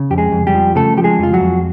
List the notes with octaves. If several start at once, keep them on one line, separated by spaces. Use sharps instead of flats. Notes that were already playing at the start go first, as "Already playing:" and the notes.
Already playing: C#3
F2 G4
G#3 G#4
F2
G3 G4
F3
C#3 A3 A4
F3 G4
G#3 G#4
F2 F4
F#3 F#4
F2